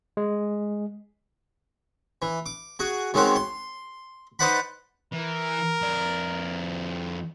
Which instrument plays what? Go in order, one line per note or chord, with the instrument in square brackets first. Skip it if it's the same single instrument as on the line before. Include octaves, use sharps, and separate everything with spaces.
[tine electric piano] G#3
[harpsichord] E3
D6
F#4 G#4
D#3 G#3 C4 C#4 F#4 A#4
C6
D#4 B4 C5 D5 F#5 B5
[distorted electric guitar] E3 [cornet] A#4
[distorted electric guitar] F2 D5